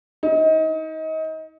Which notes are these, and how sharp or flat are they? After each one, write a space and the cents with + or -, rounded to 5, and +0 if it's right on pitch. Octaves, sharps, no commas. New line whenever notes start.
D#4 +30